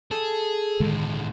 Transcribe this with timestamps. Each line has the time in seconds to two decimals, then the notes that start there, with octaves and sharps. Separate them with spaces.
0.11 G#4 A4
0.80 C#2 A2 D3 D#3 G#3